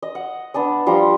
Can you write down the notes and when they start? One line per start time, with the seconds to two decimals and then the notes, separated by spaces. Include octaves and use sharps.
0.02 D#5
0.15 F#5
0.54 B3 D4 A5 D#6
0.86 F3 G3 A#5 C6